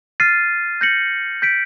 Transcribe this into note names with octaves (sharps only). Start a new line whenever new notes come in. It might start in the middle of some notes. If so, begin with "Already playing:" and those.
F6 A6 C7 D#7
G6 A#6 C#7 F#7
G6 B6 D7